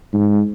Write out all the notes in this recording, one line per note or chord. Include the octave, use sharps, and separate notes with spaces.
G#2